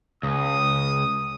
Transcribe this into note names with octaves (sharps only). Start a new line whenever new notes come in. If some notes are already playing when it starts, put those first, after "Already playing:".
C#2 D#6